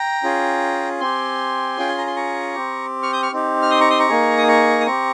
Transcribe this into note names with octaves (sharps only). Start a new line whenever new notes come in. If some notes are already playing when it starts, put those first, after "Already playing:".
Already playing: G5 A#5
C#4 F4 G#4
C4 G4 G#5 C6
C#4 F4 G#4 G5
G#5
A#5
C6
A#5 C#6
C4 G4
C#6 F6
D#6 G6
C#6 F6
C4 D#4 G4
F6
C6 D#6
A#5 C#6
C6 D#6
A#5 C#6
A#3 D#4 G#4
D#6
A#5 C#6
D#6
C4 G4 A#5 C#6